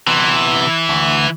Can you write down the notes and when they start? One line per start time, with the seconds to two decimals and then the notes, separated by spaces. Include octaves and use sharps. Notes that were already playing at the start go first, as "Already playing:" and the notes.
0.07 C3 E3 B3
0.89 D2